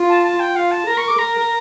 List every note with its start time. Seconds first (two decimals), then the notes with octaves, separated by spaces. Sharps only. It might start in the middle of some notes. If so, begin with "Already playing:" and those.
Already playing: F4
0.09 A5
0.24 A5
0.40 G5
0.56 F4 F5
0.71 A5
0.87 A#4 A#5
0.97 C#6
1.08 D6
1.19 A#4 A#5